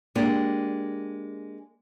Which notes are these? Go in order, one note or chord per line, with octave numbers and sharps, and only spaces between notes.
G#3 A#3 D4 G4